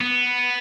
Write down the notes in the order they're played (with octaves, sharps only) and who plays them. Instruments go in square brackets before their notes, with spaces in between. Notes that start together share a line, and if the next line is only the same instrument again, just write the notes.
[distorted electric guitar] B3